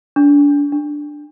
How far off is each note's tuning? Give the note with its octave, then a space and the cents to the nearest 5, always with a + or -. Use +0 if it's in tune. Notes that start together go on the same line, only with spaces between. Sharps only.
D4 -30
D4 +5